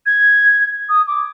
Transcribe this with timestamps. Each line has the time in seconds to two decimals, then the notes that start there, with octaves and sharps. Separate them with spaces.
0.06 G#6
0.89 D#6
1.07 D6